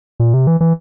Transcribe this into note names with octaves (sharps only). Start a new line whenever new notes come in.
A#2
C3
E3
E3